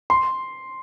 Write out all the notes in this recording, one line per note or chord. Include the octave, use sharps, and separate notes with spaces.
C6